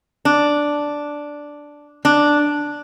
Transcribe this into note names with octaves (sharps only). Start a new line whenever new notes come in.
D4
D4